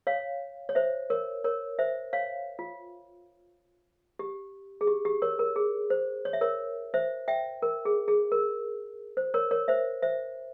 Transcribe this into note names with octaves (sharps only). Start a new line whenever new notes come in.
C#5 F5
C#5
C5 E5
A#4 C#5
A#4 C#5
C5 E5
C#5 F5
F4
G4
G#4
G4
G4
A#4 C#5
A#4
G#4
C5
C#5
E5
A#4 C#5
C5 E5
E5 G5
A#4
G#4
G#4
A#4
C5
A#4 C#5
A#4 C#5
C5 E5
C5 E5